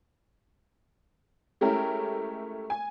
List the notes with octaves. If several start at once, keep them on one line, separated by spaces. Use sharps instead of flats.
G#3 A3 C#4 E4 G4 A#4
G#5